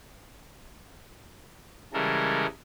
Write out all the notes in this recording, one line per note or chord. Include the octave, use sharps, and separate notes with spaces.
C#3 E3 G3 G#3 A4 A#4